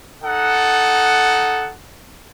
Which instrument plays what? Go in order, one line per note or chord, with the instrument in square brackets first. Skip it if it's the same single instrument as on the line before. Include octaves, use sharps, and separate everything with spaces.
[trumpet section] D#4 A4 F#5